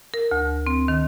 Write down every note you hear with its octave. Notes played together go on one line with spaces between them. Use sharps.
A#4
D2
C4
D#3